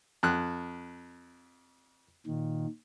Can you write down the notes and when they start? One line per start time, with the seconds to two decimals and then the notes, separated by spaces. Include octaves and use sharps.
0.23 F2 F#6
2.27 A#2 D#3